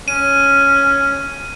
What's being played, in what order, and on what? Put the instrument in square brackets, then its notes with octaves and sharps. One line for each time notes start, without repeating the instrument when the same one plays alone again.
[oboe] C#4 [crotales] D#7